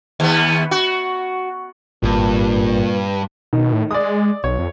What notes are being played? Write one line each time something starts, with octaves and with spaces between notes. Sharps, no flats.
D#2 B3
F#4
G#1 G2 A#2
B2 D#3
A2
G#3 D5 D#6
B1 C#5
F2